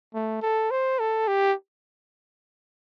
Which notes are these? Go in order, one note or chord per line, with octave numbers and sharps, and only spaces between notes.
A3
A4
C5
A4
G4